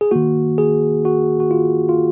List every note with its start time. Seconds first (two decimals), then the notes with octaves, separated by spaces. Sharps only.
0.01 G#4
0.11 D#3 A#3 F#4
0.58 G#4
1.05 F#4
1.40 F#4
1.51 F4
1.89 F4